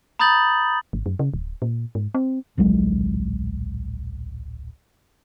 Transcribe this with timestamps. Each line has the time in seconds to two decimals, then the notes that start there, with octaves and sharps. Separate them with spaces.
0.19 A#5 B5 D#6 G6 A6 F#7
0.93 G#1
1.06 F#2
1.19 C#3
1.34 D1
1.62 A#2
1.95 G#2
2.15 C4
2.58 D1 A#1 F#3 G#3